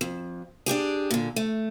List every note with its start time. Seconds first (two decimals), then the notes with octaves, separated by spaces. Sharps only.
0.01 F2
0.66 D4 D#4 G4 G#4
1.11 A#2 D3
1.36 A3